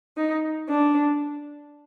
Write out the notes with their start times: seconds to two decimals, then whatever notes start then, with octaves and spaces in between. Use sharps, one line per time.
0.16 D#4
0.67 D4